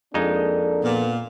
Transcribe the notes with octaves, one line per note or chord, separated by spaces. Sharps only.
F2 G#3 A#3 D4 D#4 A4 A#4
A#2 B3